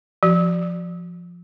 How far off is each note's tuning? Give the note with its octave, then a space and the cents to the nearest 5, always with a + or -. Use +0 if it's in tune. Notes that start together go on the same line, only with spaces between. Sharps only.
F3 +0 F#4 +25